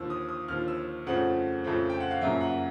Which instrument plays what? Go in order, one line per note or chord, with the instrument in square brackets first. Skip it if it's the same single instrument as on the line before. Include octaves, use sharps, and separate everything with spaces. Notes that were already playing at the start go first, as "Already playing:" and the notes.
Already playing: [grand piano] D#2 D3 F3 E6
D#6
D#6
D#2 D3 F3 F6
E6
F2 C#3 F3 A3 C4 F#5
F2 C#3 F3 A3 C4
G5
F#5
F5
F#2 C#3 F3 A#3 E5
F#5